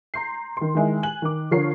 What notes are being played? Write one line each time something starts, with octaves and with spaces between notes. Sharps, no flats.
A#5 C6 G6 C7
D#3 C6
D#3 G#3 E4
G#5 F#6 F#7
D#3 D6
D3 F3 A#4 C#5 C7